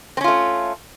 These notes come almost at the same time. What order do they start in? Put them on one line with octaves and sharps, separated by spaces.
C4 C#4 F4 A3